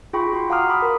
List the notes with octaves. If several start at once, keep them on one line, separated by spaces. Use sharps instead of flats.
F4 G#4 G5 B5 C#6
F#4 C6
F5 F#5 A#5 D6 D#6 F6
B5 D6 D#6
A#4 B5